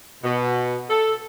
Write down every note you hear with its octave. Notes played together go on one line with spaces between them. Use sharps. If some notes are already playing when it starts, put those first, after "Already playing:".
B2
A4